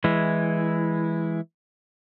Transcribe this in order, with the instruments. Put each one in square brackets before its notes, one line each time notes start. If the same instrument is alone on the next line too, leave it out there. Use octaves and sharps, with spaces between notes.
[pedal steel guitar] E3 G#3 E4